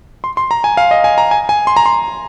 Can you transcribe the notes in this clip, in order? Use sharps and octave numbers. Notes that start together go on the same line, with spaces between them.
C6
C6
A#5
G#5
F5
D#5
G#5
A#5
G#5
G#5
C6
A#5
C6